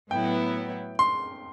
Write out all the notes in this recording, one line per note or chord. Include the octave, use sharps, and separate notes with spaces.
A2 F#3 B3 E4 G5
C6